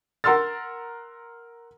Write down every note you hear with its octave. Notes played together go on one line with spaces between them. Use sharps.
A#4 F#5 C6 E6 F6 A6